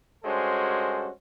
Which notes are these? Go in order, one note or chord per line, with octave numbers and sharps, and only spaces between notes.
G2 G#3 C#4 F#4 A4 C5